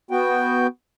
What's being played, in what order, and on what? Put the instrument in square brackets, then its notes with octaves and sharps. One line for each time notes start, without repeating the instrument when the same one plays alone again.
[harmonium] B3 F#4 G5